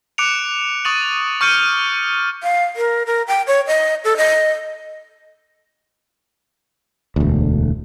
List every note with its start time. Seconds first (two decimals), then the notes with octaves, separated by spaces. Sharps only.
0.18 D6 F#6 C#7 D7 F7
0.85 C#6 D#6 A6 D#7 F#7
1.41 C#6 F6 G6 C#7 D#7
2.43 F5
2.76 A#4
3.06 A#4
3.28 G5
3.47 C#5
3.67 D#5
4.04 A4
4.17 D#5
7.16 E1 D2